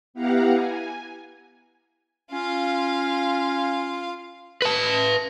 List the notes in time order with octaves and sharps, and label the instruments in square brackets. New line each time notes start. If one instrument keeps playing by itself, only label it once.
[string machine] B3 E4 G4 F5 F#5 A#5
G#5
[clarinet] C#4 [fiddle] F4 F5
[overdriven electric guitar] B4 A5